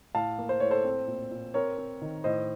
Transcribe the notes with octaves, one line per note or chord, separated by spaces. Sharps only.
A2 F5 A5
A#3
C5
A2 C#5
A4 C5
C4
A#2
A#2
C4 A#4 C#5
C4
D#3
A2 C5 D#5